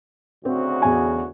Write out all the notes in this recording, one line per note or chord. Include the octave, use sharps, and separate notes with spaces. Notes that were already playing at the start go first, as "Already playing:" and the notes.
D2 C#3 C4 F#4
E2 G#5